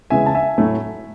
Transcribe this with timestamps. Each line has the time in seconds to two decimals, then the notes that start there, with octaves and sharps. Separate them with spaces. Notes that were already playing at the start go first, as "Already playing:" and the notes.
0.10 C#3 E3 G#3 B3 E5 G#5
0.26 A5
0.35 E5 G#5
0.58 A2 F#3 A3